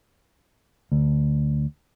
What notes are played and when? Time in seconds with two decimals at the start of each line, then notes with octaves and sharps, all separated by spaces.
0.92 D2